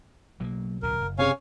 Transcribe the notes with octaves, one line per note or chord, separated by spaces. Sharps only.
B1 F#3 A3 A#3
D1 D2 B2 A#4
F#1
C3 C#4 G#4 C#5 F5 G#5